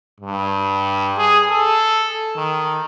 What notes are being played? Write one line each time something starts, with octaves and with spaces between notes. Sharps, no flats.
G2
G#4
A4
D#3